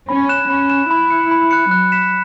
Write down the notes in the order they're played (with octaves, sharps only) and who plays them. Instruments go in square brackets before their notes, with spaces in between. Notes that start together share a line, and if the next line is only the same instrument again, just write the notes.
[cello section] C#4 [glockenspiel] B5
[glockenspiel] F#6 E7
[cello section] C#4 [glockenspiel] B5
[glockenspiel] F#6 E7
[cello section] E4 [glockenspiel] B5
[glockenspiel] F#6 C#7
B5
F#6 C#7
[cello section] F#3 [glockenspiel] F#6
[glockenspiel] B6 E7